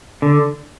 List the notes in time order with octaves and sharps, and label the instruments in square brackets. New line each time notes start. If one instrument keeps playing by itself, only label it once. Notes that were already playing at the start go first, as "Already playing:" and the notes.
[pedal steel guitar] D3